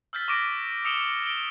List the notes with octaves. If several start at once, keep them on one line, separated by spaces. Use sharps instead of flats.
E6 F6 G6 A6 B6
C#6 D6 A#6 B6 D7 D#7
D#6 E6 C#7 D7 E7 G7
D7 G7